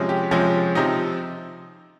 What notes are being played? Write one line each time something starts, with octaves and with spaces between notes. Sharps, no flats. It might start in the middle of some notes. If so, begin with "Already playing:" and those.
Already playing: C3 F3 G#3 C#4
G4
C3 F3 G#3 C#4
C3 F3 C4 D#4